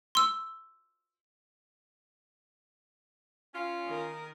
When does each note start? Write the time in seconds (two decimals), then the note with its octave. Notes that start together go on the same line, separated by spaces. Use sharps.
0.15 C6 E6
3.54 C#4 F4
3.87 D#3 A#4